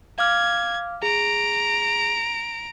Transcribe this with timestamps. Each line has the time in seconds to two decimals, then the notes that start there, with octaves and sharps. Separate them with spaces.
0.18 F5 D6 F6 G#6
1.03 G#4 A#5 D7